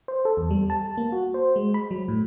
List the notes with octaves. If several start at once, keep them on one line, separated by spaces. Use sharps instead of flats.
C5
A4
E2
G3
A5
A#3
F#4
C5
G#3
B5
F#3
A2